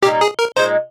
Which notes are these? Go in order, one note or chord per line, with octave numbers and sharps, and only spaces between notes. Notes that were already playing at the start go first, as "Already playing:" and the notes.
A#2 G3 A#3 D#4 G4
G#4
A#4
A#2 G#3 D#4 C5